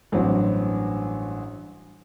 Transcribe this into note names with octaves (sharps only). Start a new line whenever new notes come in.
A1 G2 F#3 C4